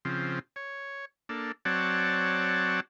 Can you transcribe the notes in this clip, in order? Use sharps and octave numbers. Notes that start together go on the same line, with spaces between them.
C#3 F3 C4
C#5
A#3 D4 A4
F#3 C4 C#5 D5 F#5 A5